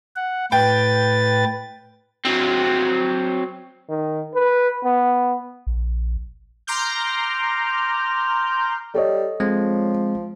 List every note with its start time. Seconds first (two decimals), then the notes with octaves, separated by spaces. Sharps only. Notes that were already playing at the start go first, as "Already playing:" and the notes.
0.16 F#5
0.52 A2 B4 G5 A6
2.25 F#3 C4
3.89 D#3
4.35 B4
4.84 B3
5.67 A#1
6.67 A#5 C6 D6 F6 G6
8.94 G3 A4 C#5 D#5
9.40 F3 G#3 C4